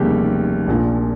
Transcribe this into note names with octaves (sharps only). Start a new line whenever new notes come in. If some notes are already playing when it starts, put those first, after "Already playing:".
Already playing: F1 D#2 C#3 G3 G4
A#1 A#2 F3